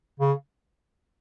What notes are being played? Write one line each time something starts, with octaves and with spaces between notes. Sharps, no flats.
C#3